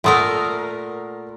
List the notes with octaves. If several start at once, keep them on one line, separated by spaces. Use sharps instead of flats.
A#2 A3 A#4 F#5 C6 D#6